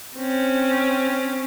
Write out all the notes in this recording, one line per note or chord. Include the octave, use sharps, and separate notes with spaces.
C4 C#4